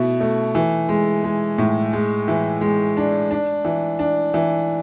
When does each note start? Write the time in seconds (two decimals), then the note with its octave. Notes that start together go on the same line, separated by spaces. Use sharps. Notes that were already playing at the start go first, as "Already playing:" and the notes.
Already playing: B2 A3 E4
0.20 A3
0.55 E3
0.89 G#3
1.24 G#3
1.58 A2
1.93 G#3
2.28 E3
2.61 G#3
2.97 D4
3.31 D4
3.65 E3
3.99 D4
4.34 E3